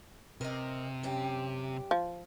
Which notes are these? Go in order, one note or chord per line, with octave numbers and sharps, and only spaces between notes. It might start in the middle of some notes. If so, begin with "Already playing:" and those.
C3 A#4 D#5
F#2 G4
F3